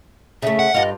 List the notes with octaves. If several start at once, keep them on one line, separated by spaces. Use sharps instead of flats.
C#3 A3 E5
F#5
G2 F4 D#5